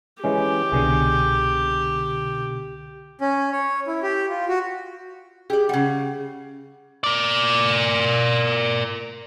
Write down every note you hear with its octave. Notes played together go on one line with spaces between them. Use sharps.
E3 G#3 C#4 G4
C2 B2 D3 G#4
C#4
C#5
E4
G4
F4
F#4
G4 G#4 D5
C#3 G3 F#5
A#4 D5